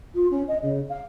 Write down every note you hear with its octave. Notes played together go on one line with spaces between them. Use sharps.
F4
C#4
D#5
C#3
F5